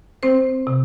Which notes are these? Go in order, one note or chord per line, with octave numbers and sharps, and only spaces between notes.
C4 C5
C3